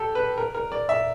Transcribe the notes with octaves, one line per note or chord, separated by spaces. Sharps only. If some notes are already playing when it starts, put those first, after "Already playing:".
Already playing: G4 A4
B4
A#4
A#4
D5
E5